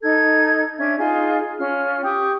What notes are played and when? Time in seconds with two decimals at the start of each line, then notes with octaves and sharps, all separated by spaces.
0.03 D#4 A4 G#6
0.78 C#4 D4 E5 G#6
0.99 D#4 F4 G#4 G#5
1.40 G#4
1.59 C#4 F4 F6
2.04 G4 G5 C#6 D#6